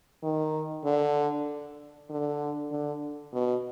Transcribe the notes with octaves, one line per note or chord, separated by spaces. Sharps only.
D#3
D3
D3
D3
B2